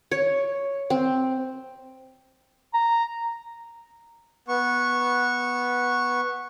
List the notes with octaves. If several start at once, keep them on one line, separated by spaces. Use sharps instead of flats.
C#5
C4
A#5
B3 C#6